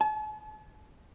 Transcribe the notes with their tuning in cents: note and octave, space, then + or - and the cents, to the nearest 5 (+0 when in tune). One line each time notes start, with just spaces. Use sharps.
A5 -45